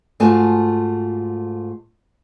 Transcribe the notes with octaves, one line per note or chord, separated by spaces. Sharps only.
G#2 A3 F4 F#4 G#5 A5